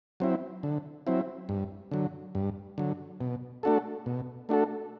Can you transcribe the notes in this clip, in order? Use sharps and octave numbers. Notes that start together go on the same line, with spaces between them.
F#3 C4 E4
D3
F#3 C4 E4
G2
D3 F#3
G2
D3 F#3
B2
A3 D4 F#4 A4
B2
A3 D4 F#4 A4